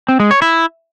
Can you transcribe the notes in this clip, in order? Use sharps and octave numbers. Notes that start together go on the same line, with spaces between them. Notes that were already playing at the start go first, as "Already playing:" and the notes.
C4
G#3
C#5
E4